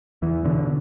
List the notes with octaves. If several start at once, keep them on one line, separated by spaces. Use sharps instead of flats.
E2 E3
B2 D3